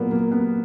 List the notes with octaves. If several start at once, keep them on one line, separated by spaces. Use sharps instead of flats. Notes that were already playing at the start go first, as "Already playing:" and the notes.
Already playing: A#2 F#3 A#3 B3
A#3
B3